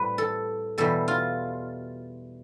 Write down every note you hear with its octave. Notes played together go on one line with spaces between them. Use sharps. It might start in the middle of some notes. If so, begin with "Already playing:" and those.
Already playing: A2 G3 C4 B4
A4
E2 B2 G3 A4
F4